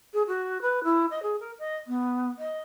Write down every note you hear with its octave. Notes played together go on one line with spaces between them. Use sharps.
G#4
F#4
B4
E4
D#5
G#4
A#4
D#5
B3
D#5